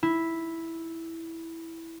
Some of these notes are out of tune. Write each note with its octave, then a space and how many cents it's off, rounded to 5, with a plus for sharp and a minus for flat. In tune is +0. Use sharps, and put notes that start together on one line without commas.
E4 -5